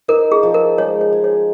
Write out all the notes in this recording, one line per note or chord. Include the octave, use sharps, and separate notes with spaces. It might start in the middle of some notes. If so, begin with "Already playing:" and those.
D#4 A#4
G#4
F3
A#4
G#3 C#5
C#5
G#4
C#5